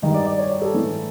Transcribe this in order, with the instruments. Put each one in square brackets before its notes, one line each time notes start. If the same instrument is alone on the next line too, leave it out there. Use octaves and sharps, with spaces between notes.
[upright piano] G2 D#3 D#5
D5
D5
C#5
D5
A4
A2 E3